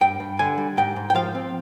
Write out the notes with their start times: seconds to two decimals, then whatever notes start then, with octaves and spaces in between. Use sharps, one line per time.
0.01 G2 G5
0.20 G2
0.39 D3 G#5
0.58 G3
0.77 G#2 G5
0.96 G#2
1.10 G5
1.15 F3 F5
1.35 C4